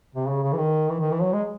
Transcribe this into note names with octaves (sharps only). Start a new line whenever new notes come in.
C3
C#3
C#3
E3
D#3
E3
D#3
E3
F#3
G#3